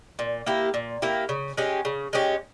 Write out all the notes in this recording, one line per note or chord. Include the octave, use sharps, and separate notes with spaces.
A#2
A#3 E4 G4
A#2
A#3 E4 G4
C#3
G#3 C#4 G4
C#3
G#3 C#4 G4